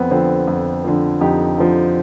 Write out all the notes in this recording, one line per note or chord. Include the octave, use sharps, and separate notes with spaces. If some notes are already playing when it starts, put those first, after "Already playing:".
Already playing: F2 B3 C4
D3 F3 C4
F2
D3 F3
F2 D#4 G4
D3 F3